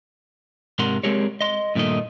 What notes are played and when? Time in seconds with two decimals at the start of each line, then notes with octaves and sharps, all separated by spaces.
0.79 G#2 C3 A#4 F#5 C6
1.03 G#3 C4 G4 G#4 A#4 C#5
1.41 D#5 C6
1.75 G2 A#2 D#3 A3 D#5